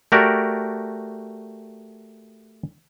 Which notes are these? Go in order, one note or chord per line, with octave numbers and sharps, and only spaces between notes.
A3 F#4 G4 A#4 D5